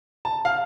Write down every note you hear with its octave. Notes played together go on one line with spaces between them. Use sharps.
A5
F5